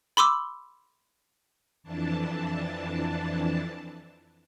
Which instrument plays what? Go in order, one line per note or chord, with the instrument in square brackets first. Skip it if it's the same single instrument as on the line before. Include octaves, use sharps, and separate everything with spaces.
[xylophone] B5 C6 D6 E6
[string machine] F2 E3 D4 A5